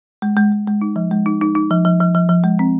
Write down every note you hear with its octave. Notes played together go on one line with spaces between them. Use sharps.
G#3
G#3
G#3
G#3
D#4
F3
G#3
D#4
D#4
D#4
F3
F3
F3
F3
F3
G#3
C4